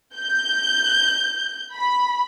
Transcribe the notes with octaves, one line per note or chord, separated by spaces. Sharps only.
G6
B5